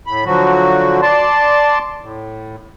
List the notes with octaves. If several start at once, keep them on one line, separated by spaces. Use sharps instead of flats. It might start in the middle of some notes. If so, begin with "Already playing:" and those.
A2 B5
D3 F3 F#3 F#4
D5 A5 C6
A2